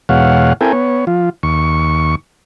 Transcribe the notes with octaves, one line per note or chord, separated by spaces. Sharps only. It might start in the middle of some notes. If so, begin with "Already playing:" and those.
E2 B2 G#3 C#5 F5 F#5
C4 E4 A4 A#4 G5 G#5
B3 C#5
F3 F4
D#2 C#6